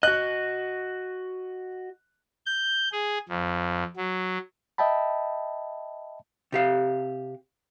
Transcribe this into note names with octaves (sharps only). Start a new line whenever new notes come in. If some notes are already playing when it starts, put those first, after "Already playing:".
F#4 D#5 F#6
G6
G#4
F2
F#3
D#5 E5 G5 A5 B5
C3 G4 F5